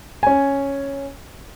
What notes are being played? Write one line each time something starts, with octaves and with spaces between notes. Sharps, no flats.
C#4 G#5